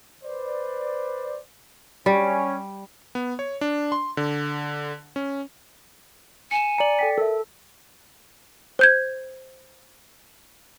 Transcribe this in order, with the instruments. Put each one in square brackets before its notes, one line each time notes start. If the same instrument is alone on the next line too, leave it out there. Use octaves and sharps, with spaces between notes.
[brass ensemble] B4 C5 D5
[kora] G3 [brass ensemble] C#4
[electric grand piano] B3
C#5
D4
C6
D3
C#4
[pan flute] G#5 [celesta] C#7 E7
[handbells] D5 C#7 [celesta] A#5 F#7
[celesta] A4 G5 B6
[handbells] A4 [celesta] A#4 E5
[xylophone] C5 G6 G#6